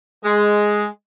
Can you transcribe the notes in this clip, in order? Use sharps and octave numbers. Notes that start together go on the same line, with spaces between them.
G#3